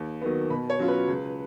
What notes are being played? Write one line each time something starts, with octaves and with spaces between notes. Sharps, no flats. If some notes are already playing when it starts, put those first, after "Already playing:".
Already playing: D#2
D#3 F#3 B3
B2 B5
C#5
F#3 C#4 F4
B4
C#2